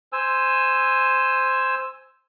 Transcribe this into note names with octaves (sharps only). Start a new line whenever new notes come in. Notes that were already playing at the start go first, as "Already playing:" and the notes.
C5 G#5 E6